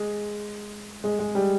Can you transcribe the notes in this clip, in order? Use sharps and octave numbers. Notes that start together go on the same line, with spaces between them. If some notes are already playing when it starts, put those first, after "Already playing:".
Already playing: G#3
G#3
G#3
G3